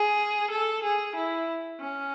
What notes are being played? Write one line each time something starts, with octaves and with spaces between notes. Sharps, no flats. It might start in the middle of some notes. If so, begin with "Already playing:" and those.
Already playing: G#4
A4
G#4
E4
C#4